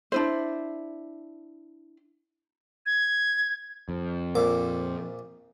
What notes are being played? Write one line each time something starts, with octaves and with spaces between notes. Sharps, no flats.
D4 E4 C5
G#6
F2
A#1 A#2 A#4 D6